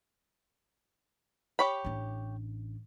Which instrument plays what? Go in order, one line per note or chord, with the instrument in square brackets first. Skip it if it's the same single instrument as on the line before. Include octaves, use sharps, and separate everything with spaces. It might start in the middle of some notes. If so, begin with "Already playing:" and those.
[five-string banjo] G4 C#5 B5
[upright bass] A1 D4